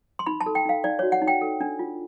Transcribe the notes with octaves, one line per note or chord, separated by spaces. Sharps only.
C6
D#4 B5
A5
A4
G5
D#4 F5
D#4 D5
F#4 C#5
F#5
D#4
G5
A4
D4
F4